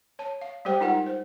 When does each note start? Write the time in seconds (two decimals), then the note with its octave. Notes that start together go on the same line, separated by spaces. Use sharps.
0.19 C#5 A5
0.42 F5
0.65 G3 G#3 G4 C5 G5
0.81 D#4 F4 A#4 F#5
1.06 C5